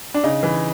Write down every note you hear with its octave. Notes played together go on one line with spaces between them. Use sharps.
D4
C#3 D#4
E3